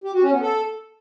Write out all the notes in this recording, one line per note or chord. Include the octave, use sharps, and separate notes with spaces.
G4
F#4
C#4
B3
A4